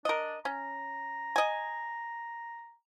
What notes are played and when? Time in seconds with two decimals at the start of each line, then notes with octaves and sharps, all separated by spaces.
0.05 D4 A#4 D#5
0.45 C#4 A#5
1.36 D#5 G#5